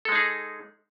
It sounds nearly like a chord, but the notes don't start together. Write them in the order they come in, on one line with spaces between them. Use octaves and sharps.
A4 G#3 D#4 G#4